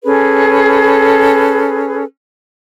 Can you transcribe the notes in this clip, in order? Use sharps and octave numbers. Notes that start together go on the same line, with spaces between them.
C#4 G#4 A4 B4